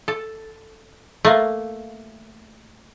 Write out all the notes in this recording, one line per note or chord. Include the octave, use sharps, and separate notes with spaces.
A4
A3 A#3